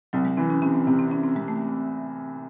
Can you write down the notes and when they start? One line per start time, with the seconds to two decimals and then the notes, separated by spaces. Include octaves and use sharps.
0.13 C2 F#3
0.25 G#3
0.37 E3 C4
0.50 C#4
0.62 C3 C#4
0.74 C4
0.87 C3 C4
0.99 C4
1.11 C3 C#4
1.24 C4
1.35 C3 G#3
1.48 A3